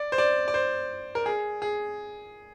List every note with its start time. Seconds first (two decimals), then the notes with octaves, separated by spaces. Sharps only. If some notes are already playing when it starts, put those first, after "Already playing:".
Already playing: D5
0.12 C5
0.18 D5
0.48 D5
0.54 C5
1.15 A#4
1.26 G#4
1.62 G#4